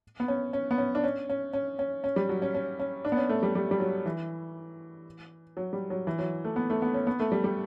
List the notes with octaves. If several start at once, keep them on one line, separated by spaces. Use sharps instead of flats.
B3
C#4
C#4
B3
C#4
D4
C#4
C#4
C#4
C#4
C#4
G3
F#3
C#4
C#4
C#4
D4
B3
C#4
A3
G3
G3
G3
F#3
E3
F#3
G3
F#3
E3
F#3
A3
B3
A3
B3
C#4
B3
A3
G3
G3